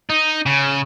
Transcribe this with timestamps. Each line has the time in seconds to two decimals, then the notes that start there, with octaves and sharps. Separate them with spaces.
0.10 D#4
0.46 C#3